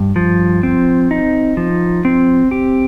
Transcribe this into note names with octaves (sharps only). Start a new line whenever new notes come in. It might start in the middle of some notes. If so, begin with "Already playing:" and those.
Already playing: G2
F3
C4
D#4
F3
C4
G4